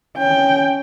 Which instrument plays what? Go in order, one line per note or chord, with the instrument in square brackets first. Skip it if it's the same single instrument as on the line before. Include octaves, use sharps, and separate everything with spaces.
[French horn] C#4 [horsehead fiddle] G5